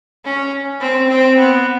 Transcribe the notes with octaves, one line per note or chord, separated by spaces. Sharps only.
C#4
C4
C4
B3